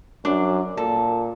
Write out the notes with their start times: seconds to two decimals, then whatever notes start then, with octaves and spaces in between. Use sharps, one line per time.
0.25 F#2 D4
0.77 A#2 A4